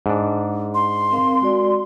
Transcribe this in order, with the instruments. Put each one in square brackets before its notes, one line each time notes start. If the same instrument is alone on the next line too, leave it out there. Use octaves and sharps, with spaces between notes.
[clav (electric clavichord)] G#2 D4
[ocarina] C6
[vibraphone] C4 A#4 F5
G#3 F#4 D5